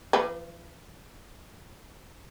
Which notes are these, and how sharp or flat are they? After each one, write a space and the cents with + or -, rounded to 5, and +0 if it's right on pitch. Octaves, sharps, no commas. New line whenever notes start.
F3 -40 B4 +5